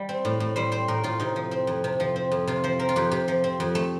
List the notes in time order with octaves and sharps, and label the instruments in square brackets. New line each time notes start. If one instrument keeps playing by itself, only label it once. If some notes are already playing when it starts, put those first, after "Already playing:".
Already playing: [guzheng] G3
C4
A2
A2
G3 C5
C4 C5
A2 A#4
A2 F4
C3 D#4
F3
C4
F2
C3
F3
C4
F2
C3 F4
F3 C5
C4 A#4
F4
F2 G4
C3 G4
F3
C4
F2
A3